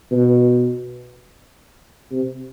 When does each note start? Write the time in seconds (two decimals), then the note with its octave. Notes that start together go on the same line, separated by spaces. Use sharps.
0.11 B2
2.12 C3